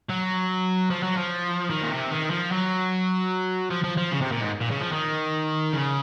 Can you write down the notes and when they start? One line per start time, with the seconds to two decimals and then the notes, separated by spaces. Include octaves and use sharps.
0.10 F#3
0.90 F3
1.03 F#3
1.17 F3
1.70 D#3
1.82 A#2
1.91 C3
2.10 D#3
2.30 F3
2.51 F#3
3.71 F3
3.84 F3
3.97 F3
4.11 C#3
4.21 C3
4.32 A#2
4.41 G#2
4.61 A#2
4.71 C#3
4.81 F3
4.92 D#3
5.72 C#3